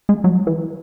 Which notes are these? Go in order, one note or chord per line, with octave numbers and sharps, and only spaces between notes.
G#3
F#3
E3